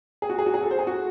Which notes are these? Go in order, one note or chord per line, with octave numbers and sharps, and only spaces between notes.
G#4
F#4
G#4
F#4
G#4
A4
C5
G#4
F#4